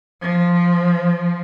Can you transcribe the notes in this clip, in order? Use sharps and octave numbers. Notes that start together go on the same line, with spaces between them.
F3